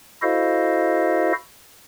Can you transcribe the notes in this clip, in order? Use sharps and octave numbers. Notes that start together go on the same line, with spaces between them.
E4 F#4 A4 C5 D#5 F5